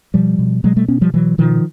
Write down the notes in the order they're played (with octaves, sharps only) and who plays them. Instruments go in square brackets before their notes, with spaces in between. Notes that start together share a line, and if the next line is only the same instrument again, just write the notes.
[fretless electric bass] B2 F3 G3
B2
B2 F#3 G#3
G3 A3
B2 B3 C#4
F3 G3
B2 E3 F#3
B2 D#3 F3